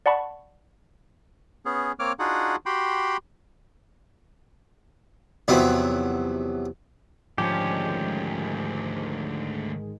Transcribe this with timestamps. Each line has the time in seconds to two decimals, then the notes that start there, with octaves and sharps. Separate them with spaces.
0.06 D5 F#5 A5 B5 C#6
1.65 B3 C#4 G#4
1.99 A#3 C4 C#5 D6 F6
2.19 D4 D#4 F4 F#4 G#4 F#5
2.66 F#4 G4 G5 B5 C6
5.48 E2 C3 F3 F#3 E4
7.38 D2 G#2 D#3 F3 G#3 C#4 G4